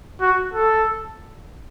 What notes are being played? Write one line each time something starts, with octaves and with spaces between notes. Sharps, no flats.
F#4
A4